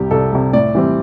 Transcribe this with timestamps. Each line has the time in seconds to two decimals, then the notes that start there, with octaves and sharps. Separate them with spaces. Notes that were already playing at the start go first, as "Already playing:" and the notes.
Already playing: C2 C3 G3 G4
0.11 C2 A4
0.32 C3 G3
0.53 A2 D5
0.75 E3 G3 C4